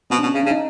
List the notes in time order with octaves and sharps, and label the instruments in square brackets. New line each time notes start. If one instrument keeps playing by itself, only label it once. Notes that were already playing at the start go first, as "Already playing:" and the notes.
[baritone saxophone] B2 [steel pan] C4
[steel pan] D4
[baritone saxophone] B2
[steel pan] C#4
[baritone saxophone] C#3
[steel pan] D4
[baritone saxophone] C#3
[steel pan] D#4